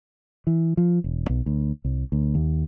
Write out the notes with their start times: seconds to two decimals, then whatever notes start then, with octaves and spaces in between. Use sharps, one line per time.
0.47 E3
0.77 F3
1.04 E1
1.29 B1
1.46 D2
1.85 C2
2.12 D2
2.35 D#2